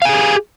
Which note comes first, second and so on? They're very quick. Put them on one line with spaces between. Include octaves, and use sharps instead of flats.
F5 G#5 G#4 G4